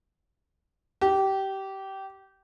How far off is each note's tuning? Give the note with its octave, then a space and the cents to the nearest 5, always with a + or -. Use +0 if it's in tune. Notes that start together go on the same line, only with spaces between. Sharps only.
G4 -20